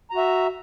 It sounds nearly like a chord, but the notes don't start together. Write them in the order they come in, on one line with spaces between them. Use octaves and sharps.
A#5 F#4 E5